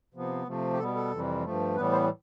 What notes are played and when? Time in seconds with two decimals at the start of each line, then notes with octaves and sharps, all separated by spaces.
0.14 C3 F3 B3
0.47 C3 F3 A3
0.73 G4
0.79 B2 G3 B3 A4
0.96 A4
1.11 F2 C3 E3 G3
1.44 G2 F3 A3
1.76 A2 E3 G3 B3 B4
1.92 C5